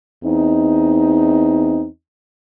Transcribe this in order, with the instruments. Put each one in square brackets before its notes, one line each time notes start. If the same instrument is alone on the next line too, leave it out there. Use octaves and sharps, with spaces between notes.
[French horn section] E2 C4 D#4